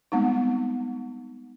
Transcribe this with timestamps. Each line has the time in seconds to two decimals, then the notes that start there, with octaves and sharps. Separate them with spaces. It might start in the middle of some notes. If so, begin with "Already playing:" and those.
0.12 G3 G#3 B3 C4 D#4